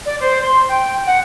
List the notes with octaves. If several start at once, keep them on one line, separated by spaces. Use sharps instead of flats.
D5
C5
C6
G5
F#5